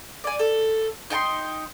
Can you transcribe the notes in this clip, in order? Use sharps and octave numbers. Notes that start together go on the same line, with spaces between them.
D5 G#5
A4
D#4 G5 A5 C6